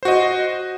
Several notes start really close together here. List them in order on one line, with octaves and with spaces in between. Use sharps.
C5 F#4 D#5